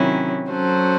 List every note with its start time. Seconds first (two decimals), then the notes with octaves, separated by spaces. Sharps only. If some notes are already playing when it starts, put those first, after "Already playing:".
Already playing: C3 D#3 F#3 C#4 E4
0.49 F#3 C#4 F#4 A4 C5